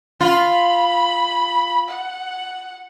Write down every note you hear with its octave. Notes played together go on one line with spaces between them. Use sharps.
F4 B5
F#5